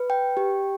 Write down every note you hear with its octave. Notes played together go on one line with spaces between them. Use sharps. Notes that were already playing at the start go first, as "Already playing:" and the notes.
Already playing: B4
G5
G4